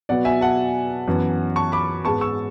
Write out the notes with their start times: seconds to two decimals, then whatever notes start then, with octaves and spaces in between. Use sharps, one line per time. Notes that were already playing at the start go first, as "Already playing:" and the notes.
0.09 B2 F#3 B3 D5 F#5
0.25 E5 G#5
0.41 F#5 A5
1.08 F#2 E3 B3
1.56 A5 C#6
1.72 B5 D6
2.05 G#2 G#3 B3 A5 C#6
2.21 C#6 E6